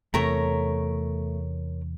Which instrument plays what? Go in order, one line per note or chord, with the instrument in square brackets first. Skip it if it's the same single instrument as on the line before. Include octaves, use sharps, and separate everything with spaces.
[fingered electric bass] E2 C3 [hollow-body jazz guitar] A3 [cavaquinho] A#4 C#5 A#5